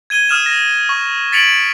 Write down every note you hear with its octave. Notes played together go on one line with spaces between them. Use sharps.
G#6 D#7 G7
D#6 F6 E7
A#6
C#6
A6 B6 C#7 D7 F7 F#7